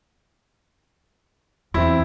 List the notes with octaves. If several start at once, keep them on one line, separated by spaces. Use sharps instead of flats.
E2 C4 E4